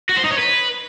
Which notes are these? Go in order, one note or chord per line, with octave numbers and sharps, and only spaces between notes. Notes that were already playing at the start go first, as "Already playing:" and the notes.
F#4
C5
D#4
C#5
B4